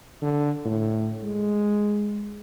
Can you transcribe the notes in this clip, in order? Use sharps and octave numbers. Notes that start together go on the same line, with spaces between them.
D3
A2
G#3